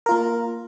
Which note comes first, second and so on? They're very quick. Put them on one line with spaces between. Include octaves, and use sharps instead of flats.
A#4 F4 A#3